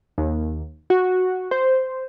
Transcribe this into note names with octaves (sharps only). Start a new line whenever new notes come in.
D#2
F#4
C5